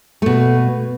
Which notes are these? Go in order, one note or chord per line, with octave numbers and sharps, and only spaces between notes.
B2 A3